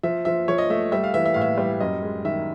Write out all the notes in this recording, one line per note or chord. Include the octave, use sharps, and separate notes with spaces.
F3 E5
F3 E5
F3 C#5
D#5
A3 E5
G3 E5
F5
E3 E5
E5
A2 F5
E5
G3
F#2 D#5
G#3
D#3 E5